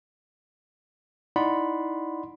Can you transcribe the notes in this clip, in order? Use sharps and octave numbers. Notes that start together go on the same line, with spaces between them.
D#4 E4 D5 F#5 B5 C6